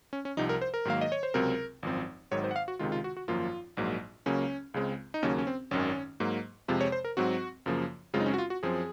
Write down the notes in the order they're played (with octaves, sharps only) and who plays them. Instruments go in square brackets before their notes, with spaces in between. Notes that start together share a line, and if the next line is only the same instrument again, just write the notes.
[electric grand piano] C#4
C#4
C2 C3 F3 D#4
A#4
C5
A#4
G#2 D#3 F#3 A#3 F5
D#5
C#5
C5
C#2 C3 F#3 C4 A#4
G#1 F#2 F3 C4
G#1 G#2 D#3 F#3 C#5
C5
F#5
F5
F#4
C#2 C3 D#3 G#3 F4
F4
F#4
F#4
G#1 F#2 F3 A#3 F4
A#1 G#2 F#3 A#3
C#2 C#3 F#3 A#3 C#4
C#2 C#3 G#3 C4
D#4
D#2 C#3 F#3 A#3 C#4
C#4
C4
G#1 F#2 D#3 C#4
G#2 F#3 A#3
F2 C3 F3 G#3 F4
C#5
C5
A#4
G#2 F#3 C4 F#4
F#2 C#3 F3 A#3
F#2 C#3 G#3 C4 F4
D#4
C#4
F#4
F4
F#4
F#2 F3 C4 G#4